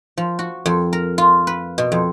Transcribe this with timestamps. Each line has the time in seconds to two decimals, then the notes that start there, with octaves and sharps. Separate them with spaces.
0.17 F3
0.39 F#4
0.66 F2
0.93 A#4
1.18 F4
1.47 B4
1.78 B2
1.92 F2